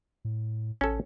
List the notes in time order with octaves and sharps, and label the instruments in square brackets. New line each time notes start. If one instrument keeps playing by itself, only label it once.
[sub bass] A2
[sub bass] A1 [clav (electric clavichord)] C#4 A4